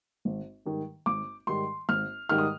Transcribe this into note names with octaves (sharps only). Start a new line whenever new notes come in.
G#1
G#2 D#3 G3
G#1 D6
G#2 D#3 G3 C6
G#1 F6
G#2 D#3 G3 F6
D#6